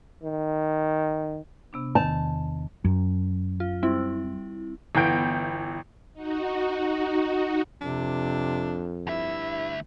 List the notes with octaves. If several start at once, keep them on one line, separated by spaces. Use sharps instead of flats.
D#3
C3 B3 D4
E2 D#3 B3 A5
F#2
F4
G3 C4 E4
G1 E3 B3 G5 G6 D7
D#4 F#4
F2 C3 D4
D2 G2 E4 E5